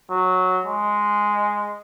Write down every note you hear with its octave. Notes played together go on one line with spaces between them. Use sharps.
F#3
G#3